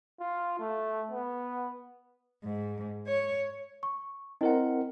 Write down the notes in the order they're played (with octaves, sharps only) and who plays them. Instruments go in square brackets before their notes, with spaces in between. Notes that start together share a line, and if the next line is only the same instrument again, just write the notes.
[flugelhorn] F4
A3
B3
[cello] G#2
C#5
[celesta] C#6
[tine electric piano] C4 A#4 F#5 [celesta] E4 D#5